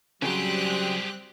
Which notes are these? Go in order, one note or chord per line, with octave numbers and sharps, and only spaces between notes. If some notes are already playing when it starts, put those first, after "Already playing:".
C#3 F#3 G3 C4 G4 G#4 G5 F#6